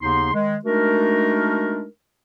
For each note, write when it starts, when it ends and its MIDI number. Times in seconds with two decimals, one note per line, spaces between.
0.01 0.32 39
0.01 0.32 49
0.01 0.32 59
0.01 0.32 63
0.01 0.32 84
0.33 0.57 51
0.33 0.57 56
0.65 1.85 56
0.65 1.85 57
0.65 1.85 62
0.65 1.85 63
0.65 1.85 66
0.65 1.85 70